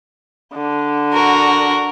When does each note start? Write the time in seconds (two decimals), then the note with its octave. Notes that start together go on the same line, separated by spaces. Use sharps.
0.54 D3
1.13 F#4 A#4